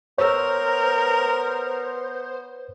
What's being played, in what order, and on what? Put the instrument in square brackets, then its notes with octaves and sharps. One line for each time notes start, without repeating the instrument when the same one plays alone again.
[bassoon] B3 [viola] A#4 [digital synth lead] C5 [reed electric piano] C#5 E6